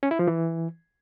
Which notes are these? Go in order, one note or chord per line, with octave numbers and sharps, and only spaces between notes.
C#4
E4
F3
E3